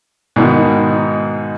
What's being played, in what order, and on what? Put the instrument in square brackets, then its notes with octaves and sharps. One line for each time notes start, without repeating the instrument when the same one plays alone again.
[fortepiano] G#2 B2 D#3